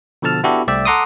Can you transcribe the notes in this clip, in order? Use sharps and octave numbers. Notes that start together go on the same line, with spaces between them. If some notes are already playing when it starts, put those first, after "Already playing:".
B2 D3 F3 A4 A5 F6
B3 D4 E4 F#4 G4 A4
C2 A3 D5 E5 G5 E6
A4 F#5 A#5 C6 D6 D#6